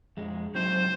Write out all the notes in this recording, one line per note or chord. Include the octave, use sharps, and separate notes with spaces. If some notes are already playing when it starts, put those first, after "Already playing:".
F2 G#3
F#3 C4 D#4 C5